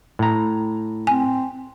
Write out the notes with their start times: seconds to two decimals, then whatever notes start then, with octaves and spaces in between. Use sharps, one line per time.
0.19 A2 A#5
1.07 C4 G#5